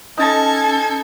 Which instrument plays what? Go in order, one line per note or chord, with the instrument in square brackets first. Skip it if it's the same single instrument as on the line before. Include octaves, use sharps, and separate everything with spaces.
[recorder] C#4 [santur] D#4 A5 A#5 [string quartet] A4 G#6